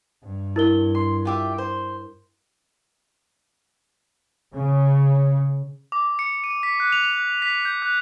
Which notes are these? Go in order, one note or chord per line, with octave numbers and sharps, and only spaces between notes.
G2
E4 A#4 G7
C6
F4 G4 E5
C5
C#3
D6
C#7
D#7
B6
F#6
F7
F#6
B6
G6
F#6